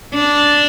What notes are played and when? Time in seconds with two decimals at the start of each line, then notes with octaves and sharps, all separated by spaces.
0.14 D4